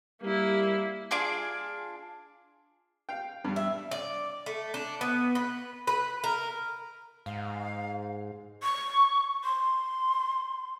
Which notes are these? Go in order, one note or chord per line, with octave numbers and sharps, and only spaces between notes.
G3 A#3 E4
D4 F4 G#4 D6
F5 G5
G2 G3
E5
D5
A3
D4
B3
B4
B4
A#4
G#2 F5
C#6
C6